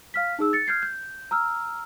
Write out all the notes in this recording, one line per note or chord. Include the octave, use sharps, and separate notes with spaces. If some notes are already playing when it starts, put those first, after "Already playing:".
F5 F6 B6
D#4 G#4 E6
A6 C#7
F6 G6 G#6 C7
G6
A#5 E6 F6